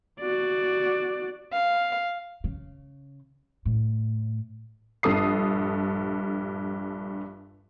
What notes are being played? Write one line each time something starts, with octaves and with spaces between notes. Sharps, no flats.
F#4 D5
F5
C#3
A2
A#1 G2 A4 D#6 C7